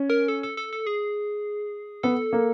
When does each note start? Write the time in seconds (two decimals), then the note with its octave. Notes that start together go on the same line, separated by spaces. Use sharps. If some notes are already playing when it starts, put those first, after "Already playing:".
Already playing: C#4
0.10 A#4
0.28 A4
0.43 A4
0.57 A4
0.73 A4
0.87 G#4
2.03 B3 A4
2.33 A#3